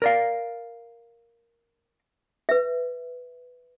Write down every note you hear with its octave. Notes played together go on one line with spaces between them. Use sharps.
A#4 D5 F5
B4 E5